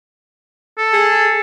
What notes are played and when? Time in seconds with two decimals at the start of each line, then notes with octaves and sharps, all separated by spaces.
0.78 A4
0.93 G#4